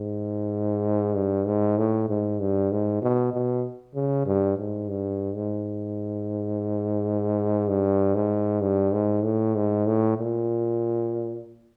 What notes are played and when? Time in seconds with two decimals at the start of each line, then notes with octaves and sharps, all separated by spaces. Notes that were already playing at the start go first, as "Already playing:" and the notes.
Already playing: G#2
1.16 G2
1.46 G#2
1.78 A2
2.09 G#2
2.40 G2
2.71 G#2
3.02 B2
3.33 B2
3.95 C#3
4.26 G2
4.58 G#2
4.89 G2
5.35 G#2
7.68 G2
8.15 G#2
8.61 G2
8.92 G#2
9.24 A2
9.55 G#2
9.86 A2
10.18 A#2